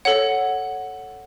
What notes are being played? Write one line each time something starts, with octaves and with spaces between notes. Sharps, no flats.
A4 C#5 F#5